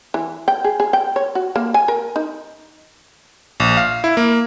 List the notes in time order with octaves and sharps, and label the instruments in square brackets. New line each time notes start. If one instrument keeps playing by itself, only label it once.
[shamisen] E3
G5
G#4
G#4
G5
C#5
F#4
A#3
G#5
A#4
D#4
[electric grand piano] A#1
F5
E4
A#3